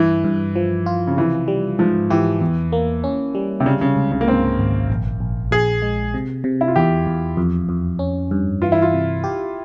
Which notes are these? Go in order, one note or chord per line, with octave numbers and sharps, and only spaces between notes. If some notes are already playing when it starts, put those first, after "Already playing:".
Already playing: G2 E3
G2
F3
F4
C#3
C3 E3
G3
G#2 F3
E3 G4
E2
A#3
C#4
G3
C3
C#3 G3
C#3
C#2
C#3
A#3
G#2 C4
G#1
A#1
A#1
A#1 G#4
G#3
C3
C3
E4
F4
E2 G4
E2
F2
F2
C#4
G2
E3 F4
E4
F4
C3
G4